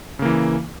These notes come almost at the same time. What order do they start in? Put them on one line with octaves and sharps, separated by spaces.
C#3 A#3 E3